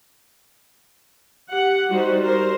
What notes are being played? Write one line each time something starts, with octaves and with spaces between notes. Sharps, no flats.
G4 F#5
G3 D#4 F#4 G4 C5
A#4 C5